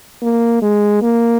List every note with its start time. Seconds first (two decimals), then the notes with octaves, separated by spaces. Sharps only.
0.22 A#3
0.62 G#3
1.02 A#3